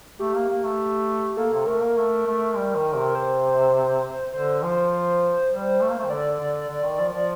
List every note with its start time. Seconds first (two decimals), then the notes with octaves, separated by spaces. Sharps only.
0.19 A3 G4
0.35 A#3
0.49 A#3
0.64 A3
1.37 A#3 A4
1.53 C3
1.67 A3 A#4
1.82 A#3
1.97 A3
2.27 A3
2.56 G3
2.76 D#3
2.95 C3
3.15 C5
4.33 D3 C5
4.63 F3
4.92 C5
5.52 G3
5.81 A3
5.90 A#3
5.99 A3
6.05 D#3
6.10 D3 D5
6.40 D3
6.69 D3
6.85 D#3
6.99 F3
7.13 F3